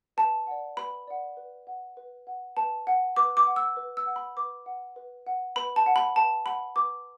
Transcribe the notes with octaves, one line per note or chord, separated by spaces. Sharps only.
B4 A5
D5 F#5
B4 B5
D5 F#5
B4
F#5
B4
F#5
B4 A5
F#5
B4 D6
D6
F#5
E6
B4
E6
F#5
B5
B4 D6
F#5
B4
F#5
B4 B5
A5
F#5
B5
B4 A5
F#5 B5
B4 D6